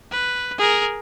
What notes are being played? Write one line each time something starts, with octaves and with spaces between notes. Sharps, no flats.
B4
G#4 A#4